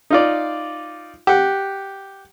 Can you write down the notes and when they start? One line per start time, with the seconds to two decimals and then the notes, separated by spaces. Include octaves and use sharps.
0.10 D#4 F4 D5
1.27 G4 F#5